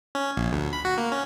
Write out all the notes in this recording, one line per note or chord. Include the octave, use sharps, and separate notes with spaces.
C#4
A#1
D2
B5
F#4
A#3
C#4